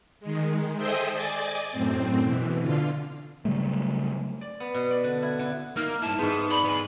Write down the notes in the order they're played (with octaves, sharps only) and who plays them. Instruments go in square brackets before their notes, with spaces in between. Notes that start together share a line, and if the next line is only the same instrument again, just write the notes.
[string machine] D#3 G#3
G#4 A4 C5 D#5 E5 G5
D5 D#5 G#5 A6
F#2 A2 C4
B2 E3
D3 F4
[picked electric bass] C#3 F#3 G3 A3
[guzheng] D5
B3
B2
D5
D3
E4
D3
[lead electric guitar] A#3 [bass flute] D#4 [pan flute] F6
[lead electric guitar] G2 E4 [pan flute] A5
[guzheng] G#2 C5 [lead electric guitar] B3 [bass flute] G#4
[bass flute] D5 [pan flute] B5
[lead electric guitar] B3 G#4